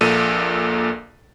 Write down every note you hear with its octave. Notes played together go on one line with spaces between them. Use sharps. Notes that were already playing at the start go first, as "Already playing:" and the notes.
A#1 A#2 A4 D#7